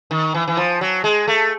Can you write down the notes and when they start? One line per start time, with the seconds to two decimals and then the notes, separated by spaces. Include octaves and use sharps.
0.11 D#3
0.34 E3
0.48 E3
0.57 F3
0.81 F#3
1.04 G#3
1.28 A3